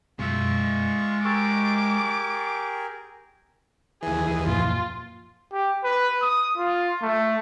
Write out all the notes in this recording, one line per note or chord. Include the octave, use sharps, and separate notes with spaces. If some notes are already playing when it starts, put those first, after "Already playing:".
F#2 B2 G#3 F4 E5 C#6
G4 G#4 A#4 C#6 D6 E6 A6
D#2 E3 G#4
F#2 A#2 F3 F4
G4
B4
D#6
F4
A3